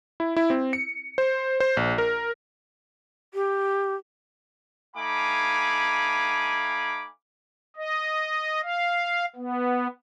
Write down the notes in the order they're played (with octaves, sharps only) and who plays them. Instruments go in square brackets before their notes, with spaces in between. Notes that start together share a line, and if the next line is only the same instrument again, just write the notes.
[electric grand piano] E4
E4
C4
C#7
C5
C5
A#1
A#4
[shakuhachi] G4
[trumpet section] A3 D#4 F5 G#5 B5 D6
[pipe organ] D#5
F5
B3